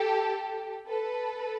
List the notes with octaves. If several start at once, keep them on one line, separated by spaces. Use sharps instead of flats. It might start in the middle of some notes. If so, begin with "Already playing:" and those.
Already playing: G4 A4
A4 B4